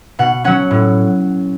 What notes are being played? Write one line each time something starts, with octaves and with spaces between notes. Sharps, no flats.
B2 F#5
F#3 C#4 F#5
A2